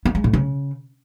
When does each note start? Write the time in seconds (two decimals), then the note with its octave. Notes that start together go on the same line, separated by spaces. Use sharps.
0.05 B3
0.15 G#3
0.24 A2
0.33 C#3